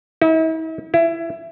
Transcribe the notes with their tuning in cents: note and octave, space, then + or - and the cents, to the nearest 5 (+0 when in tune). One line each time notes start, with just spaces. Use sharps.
E4 -45
E4 +20